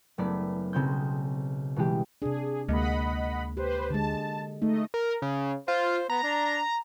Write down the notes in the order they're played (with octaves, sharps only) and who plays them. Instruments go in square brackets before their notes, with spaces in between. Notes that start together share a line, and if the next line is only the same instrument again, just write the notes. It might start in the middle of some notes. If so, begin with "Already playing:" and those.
[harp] F#1 A3 B3 D5 B6
B1 C#3 C4 G6
B2 E3 G#3 G4
[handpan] C3 D4 [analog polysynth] G#4
[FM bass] D2 [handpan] G#3 A#3 [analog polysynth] D#5 F#5 B5
[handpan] G4 [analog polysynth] B4 C5
[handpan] D3 G#3 [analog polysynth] A5
[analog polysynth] A3 D#5 [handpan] D#4
[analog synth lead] A#4
C#3
[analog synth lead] F4 [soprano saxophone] C5
[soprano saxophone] B3 [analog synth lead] A#5
[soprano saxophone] D4